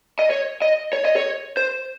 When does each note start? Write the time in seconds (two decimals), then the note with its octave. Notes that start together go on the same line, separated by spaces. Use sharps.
0.19 D#5
0.31 C#5
0.62 D#5
0.93 C#5
1.05 D#5
1.16 C#5
1.57 C5